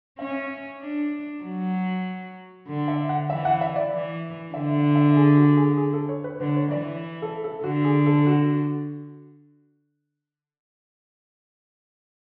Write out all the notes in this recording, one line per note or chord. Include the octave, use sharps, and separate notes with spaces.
C#4 E5
D4
F#3
D3
E5
F#5
E3 E5
F#5
E5
D5
E3
D3 E5
E5
G#4
F#4
G#4
G#4
A4
C#5
B4
D3 B4
C#5
E3 D5
A4
A4
D3 F#4
G#4
A4
F#4